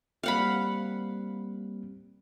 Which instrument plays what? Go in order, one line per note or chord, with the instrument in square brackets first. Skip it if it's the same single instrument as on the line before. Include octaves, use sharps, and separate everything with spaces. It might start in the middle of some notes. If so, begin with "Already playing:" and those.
[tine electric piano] G3 A#3 C4 [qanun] F5 F#5 B5